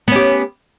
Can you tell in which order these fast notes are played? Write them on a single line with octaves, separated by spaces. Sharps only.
B3 C#4 G4